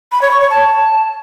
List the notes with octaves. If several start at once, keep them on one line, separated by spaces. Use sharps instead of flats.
B5
C#5
C#6
C#5
A5